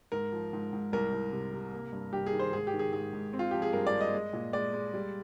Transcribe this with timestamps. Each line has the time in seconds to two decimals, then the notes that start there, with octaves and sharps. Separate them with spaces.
0.12 G#2 A#4
0.32 F3
0.53 G#2
0.73 G#2
0.93 C2 A#4
1.13 C2
1.32 C3
1.53 C3
1.73 A#3
1.92 G2
2.13 G2 G4
2.26 G#4
2.33 D#3
2.39 C5
2.53 G#2 G#4
2.67 G4
2.74 D#3
2.79 G#4
2.93 G#2 G#4
3.13 G#2
3.33 C4
3.39 F4
3.51 F3 G4
3.62 G#4
3.73 G2 A#4
3.87 D5
3.93 G#3
4.01 D#5
4.14 G#3
4.33 A#2
4.53 G#3 D5
4.73 G#3
4.94 G3